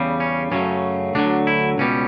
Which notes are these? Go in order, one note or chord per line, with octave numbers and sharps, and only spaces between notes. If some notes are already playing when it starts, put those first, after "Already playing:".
Already playing: E2 C#3 G3
C#4
F#2 C#3 F#3 A3 C#4
D2 D3 F#3 D4
E4
C#2 B2 G3 C#4